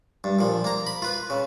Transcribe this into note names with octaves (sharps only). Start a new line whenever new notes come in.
G2
A#2 F3
A#3 A#5
B5
F4 B4
C#3